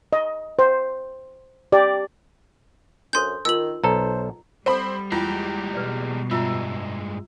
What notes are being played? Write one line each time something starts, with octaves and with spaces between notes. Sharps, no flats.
D#5
C5
G4 D5
F#2 D4 A4 C5 C6 G6
D#3 D#4 F4 A#4 E6 F#7
B1 A4 C5 A#5
G3 C4 A4 C5 F#5 B5
E2 G#3 F4 G4
B2 G3 B4 D5
G2 G#3 F4 E5 A#5 E6